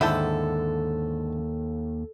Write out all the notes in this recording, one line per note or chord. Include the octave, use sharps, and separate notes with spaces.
D#2 G#2 D3 E4 A4 G5 A5